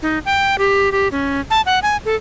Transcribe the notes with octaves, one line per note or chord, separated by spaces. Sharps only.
D#4
G5
G4
G4
C#4
A5
F#5
G#5
A4